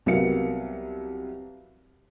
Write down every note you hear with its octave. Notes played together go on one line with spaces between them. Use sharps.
C2 F#3 B3 A#4 F5 C#7